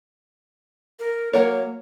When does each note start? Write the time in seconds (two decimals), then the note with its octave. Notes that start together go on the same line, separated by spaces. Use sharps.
0.99 A#4
1.33 F#3 A#3 A#4 C#5